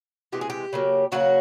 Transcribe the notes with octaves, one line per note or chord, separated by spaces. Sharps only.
C3 E3 G#3 G4
G#4
G4
C#3 F#3 A#3
C#3 F#3 A#3 F#4